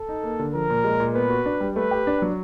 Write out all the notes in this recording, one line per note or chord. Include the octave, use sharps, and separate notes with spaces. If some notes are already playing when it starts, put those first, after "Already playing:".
Already playing: A4
D#4
A#3
D3
F3 A#4
A#2
G#3
A#2
B3 B4
F#4
D4
G3
A3 B4
G4
D4
F#3